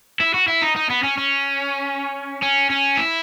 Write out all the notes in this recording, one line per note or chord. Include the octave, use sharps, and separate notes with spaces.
E4
F#4
E4
D#4
D#4
B3
C#4
C#4
C#4
C#4
E4